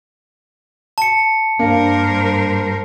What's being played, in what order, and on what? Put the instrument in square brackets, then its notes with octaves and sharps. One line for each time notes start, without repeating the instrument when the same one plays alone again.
[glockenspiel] A5 C#7
[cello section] G2 A#4 C5 [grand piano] A#3 D4